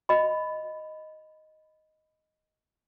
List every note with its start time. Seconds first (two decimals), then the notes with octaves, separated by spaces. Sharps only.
0.09 D#5 B5